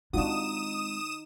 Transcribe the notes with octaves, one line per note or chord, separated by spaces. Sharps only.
G#3 C4 D4 D#4 F4 F#4 D#6 E7